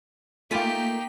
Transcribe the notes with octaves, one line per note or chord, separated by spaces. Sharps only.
A3 A#3 D#4 F4 G4 G#5 B6